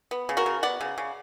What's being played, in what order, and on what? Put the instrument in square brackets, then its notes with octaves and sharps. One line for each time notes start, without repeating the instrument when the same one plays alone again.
[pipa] B3
C#3
F#4 A#4
C#3
B3 D5 F#5
C#3
C#3